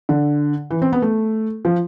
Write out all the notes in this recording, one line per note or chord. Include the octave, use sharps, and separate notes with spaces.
D3
E3
C4
B3
A3
F3